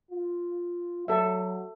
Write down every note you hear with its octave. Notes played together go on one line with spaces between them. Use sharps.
F4
F#3 A4 E5